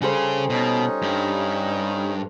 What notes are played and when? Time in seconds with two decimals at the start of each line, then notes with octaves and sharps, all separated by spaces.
0.01 C#3 G3 G#4 A4 C5
0.50 B2 C#4 D#4
1.02 G2